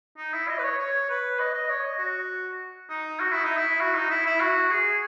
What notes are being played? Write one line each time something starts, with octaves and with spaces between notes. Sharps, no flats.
D#4
E4
D#5
B4
C#5
C#5
B4
D#5
D#5
C#5
D#5
F#4
D#4
F#4
E4
D#4
E4
F#4
D#4
E4
E4
F#4
G#4